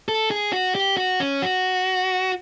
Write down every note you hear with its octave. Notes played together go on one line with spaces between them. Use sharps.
A4
G#4
F#4
G4
F#4
C#4
F#4